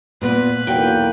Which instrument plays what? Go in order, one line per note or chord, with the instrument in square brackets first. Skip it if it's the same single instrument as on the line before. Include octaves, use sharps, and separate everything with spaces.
[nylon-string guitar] A#2 B3 [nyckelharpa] B4
[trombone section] B1 E2 A#3 [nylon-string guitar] F#4 [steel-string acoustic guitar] G5